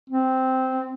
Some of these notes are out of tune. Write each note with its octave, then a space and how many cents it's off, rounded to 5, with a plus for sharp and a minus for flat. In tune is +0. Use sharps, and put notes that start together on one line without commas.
C4 -10